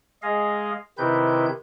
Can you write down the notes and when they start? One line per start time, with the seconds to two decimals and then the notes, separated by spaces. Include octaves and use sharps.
0.23 G#3 G#4 D#5 F5
0.98 C3 D#3 C4 E4 B4 G6